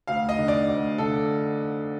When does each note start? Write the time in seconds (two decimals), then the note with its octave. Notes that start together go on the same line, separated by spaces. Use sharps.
0.07 D2 F5
0.29 D#5
0.39 D3
0.48 D5
0.69 D2
0.98 D3 A4